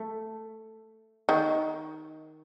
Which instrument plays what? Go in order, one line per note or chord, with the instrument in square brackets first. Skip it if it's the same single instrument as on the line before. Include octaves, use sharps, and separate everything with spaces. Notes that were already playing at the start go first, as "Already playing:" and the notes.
Already playing: [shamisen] A3
D#3